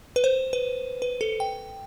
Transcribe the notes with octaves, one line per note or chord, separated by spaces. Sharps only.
B4
C5
B4
B4
A4
G5